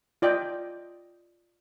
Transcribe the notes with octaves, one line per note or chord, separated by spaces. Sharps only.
F4 D5 D#5 G5